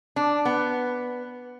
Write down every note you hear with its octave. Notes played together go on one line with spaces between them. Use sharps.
D4
B3